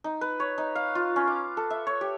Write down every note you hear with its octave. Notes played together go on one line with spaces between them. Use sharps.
D#4
B4
C#5
D#4
F5
F4
C#4
D6
A4
E5
C#5
G4